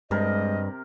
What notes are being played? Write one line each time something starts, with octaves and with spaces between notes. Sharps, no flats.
G2 C3 G#3 A#4 D#5